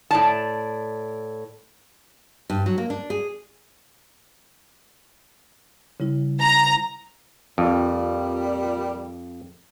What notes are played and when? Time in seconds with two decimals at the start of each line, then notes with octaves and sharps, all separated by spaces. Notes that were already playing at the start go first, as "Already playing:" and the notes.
0.11 A2 D5 A5
2.50 G2
2.66 F#3
2.78 A#3
2.90 D4
3.10 G#4
6.00 C#3 G3 E4
6.41 A#5
7.58 F2 A#2 G3